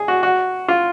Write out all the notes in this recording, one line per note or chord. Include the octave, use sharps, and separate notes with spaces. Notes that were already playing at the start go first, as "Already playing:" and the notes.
Already playing: G#4
F#4
F#4
F4